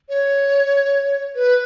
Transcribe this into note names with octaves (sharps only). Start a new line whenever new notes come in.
C#5
B4